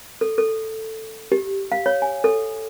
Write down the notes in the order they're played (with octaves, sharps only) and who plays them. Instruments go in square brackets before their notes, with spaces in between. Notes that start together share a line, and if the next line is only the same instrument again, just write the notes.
[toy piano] A4
A4
G4
F5
C#5
G#5
A4